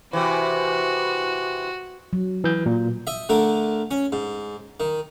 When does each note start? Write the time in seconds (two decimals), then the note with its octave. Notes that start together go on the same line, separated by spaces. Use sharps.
0.13 C3 E3 F#4
2.13 F#3
2.44 E3 G6
2.66 A#2
3.07 D#5 E5
3.29 D3 A3 A#4
3.91 C#4
4.12 G#2
4.80 D#3